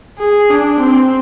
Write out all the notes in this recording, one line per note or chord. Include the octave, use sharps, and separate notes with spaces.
G#4
D4
C4